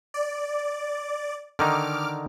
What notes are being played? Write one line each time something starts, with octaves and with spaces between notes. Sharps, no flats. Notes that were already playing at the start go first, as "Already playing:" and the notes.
D5
D3 D#3 D#4 D6 F6